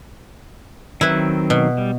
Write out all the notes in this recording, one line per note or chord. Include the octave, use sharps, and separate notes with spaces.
D#3 F#3 C4 E4 B4
B2
G3